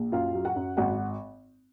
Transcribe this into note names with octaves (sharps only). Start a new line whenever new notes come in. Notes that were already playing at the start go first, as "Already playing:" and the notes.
Already playing: A#1
F#2 F4 F5
F#3
F#4 F#5
F#2
G#1 F#4 F#5